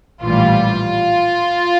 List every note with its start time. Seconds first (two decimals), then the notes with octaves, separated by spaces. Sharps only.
0.21 A#1 A2 E3 G3 F4